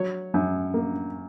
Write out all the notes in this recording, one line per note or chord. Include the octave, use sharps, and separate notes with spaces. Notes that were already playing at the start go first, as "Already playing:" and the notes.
Already playing: F#3 C#5
F#2
A#3